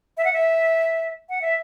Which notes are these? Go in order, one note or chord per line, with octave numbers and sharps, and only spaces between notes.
E5
F#5
E5
F#5
E5